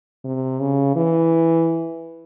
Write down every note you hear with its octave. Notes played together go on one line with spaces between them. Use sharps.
C3
C#3
E3